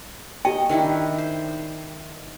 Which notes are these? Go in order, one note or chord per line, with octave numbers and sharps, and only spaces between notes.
G4 D#5 G5
D#3 D4 E4
C5